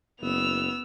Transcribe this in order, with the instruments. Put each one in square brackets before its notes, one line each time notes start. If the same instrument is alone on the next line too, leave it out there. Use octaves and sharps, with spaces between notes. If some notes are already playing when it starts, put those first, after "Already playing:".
[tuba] F#1 [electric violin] B3 [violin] E6 F7